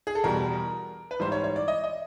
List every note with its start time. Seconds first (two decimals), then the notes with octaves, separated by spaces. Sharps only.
0.07 G#4
0.15 A4
0.24 E2 B2 G3 A#4
1.11 B4
1.20 G#2 E3 G3 C5
1.32 C#5
1.44 C#5
1.56 D5
1.68 D#5
1.84 D#5